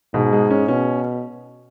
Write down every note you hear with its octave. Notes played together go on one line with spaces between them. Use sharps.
G#2 B2
G#3
C#4
B2 C#4